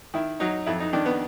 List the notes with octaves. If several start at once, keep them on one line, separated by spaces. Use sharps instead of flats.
D#3 E4
F#3 D#4
F2 E4
D#4
D#3 D4
B3